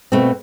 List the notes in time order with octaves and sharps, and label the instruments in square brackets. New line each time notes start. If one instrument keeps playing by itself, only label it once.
[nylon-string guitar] B2 A3 C4